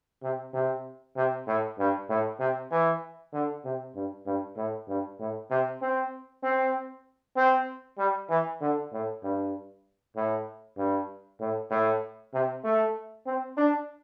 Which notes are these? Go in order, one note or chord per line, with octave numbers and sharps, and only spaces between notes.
C3
C3
C3
A2
G2
A2
C3
E3
D3
C3
G2
G2
A2
G2
A2
C3
C4
C4
C4
G3
E3
D3
A2
G2
A2
G2
A2
A2
C3
A3
C4
D4